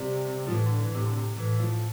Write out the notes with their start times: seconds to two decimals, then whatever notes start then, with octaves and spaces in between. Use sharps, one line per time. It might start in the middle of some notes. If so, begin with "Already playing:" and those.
Already playing: C3 G3
0.47 F3
0.51 A2 E3
0.65 D3
0.80 E3
0.94 A2 C3
1.05 D3
1.16 C3
1.37 A2 E3
1.59 F3